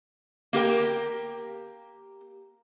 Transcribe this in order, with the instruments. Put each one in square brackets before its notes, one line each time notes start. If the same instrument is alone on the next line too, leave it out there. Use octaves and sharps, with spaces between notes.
[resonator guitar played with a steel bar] A#3 G4 A#4 G5